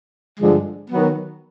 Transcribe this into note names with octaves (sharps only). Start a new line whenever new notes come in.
G2 D3 F3 G#3
D#3 F#3 B3